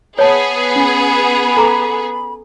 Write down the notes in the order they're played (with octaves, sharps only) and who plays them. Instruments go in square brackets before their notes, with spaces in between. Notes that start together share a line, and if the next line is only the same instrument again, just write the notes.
[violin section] B3 G#4 [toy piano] C#5 A5
[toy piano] C#4 [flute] B5
[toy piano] A4 A#5 D6